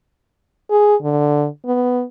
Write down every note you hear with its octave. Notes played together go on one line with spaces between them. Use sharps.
G#4
D3
B3